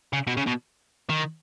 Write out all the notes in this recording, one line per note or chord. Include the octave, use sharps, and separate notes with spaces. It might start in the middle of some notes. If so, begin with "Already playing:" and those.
C#3
B2
C#3
B2
D#3